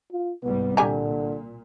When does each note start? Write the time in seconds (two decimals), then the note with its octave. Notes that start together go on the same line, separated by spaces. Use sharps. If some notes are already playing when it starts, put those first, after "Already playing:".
0.12 F4
0.43 C2 G#2 G3 B3
0.77 A#2 D3 G4 G#5 A#5